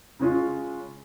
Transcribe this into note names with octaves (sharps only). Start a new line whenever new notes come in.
C#3 G#3 C#4 F4